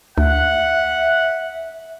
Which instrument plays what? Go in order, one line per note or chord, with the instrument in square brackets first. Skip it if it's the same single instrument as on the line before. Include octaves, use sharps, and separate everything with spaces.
[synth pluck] D2 [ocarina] E5 [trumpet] F#5